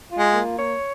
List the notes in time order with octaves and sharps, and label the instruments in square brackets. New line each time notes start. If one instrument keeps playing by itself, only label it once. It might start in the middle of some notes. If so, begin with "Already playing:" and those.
[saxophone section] F4
[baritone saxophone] G#3
[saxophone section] A#3
C#5